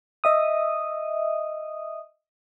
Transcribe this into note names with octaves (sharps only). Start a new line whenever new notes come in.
D#5 E5 D#6